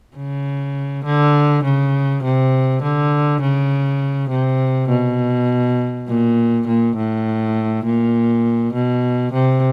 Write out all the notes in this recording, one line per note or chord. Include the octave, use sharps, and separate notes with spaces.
C#3
D3
C#3
C3
D3
C#3
C3
B2
A#2
A#2
A2
A#2
B2
C3